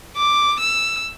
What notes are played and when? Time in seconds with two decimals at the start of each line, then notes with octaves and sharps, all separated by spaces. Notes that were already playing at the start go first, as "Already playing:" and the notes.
0.16 D6
0.60 E6